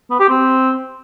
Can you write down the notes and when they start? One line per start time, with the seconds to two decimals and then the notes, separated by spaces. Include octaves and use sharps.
0.11 B3
0.20 G4
0.29 C4